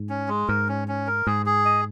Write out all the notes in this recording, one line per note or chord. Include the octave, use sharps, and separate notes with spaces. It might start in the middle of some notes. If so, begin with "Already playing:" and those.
Already playing: G#2
C#4
G#3
G#2 A#4
C#4
C#4
A#4
G#2 G#4
G#4
D#5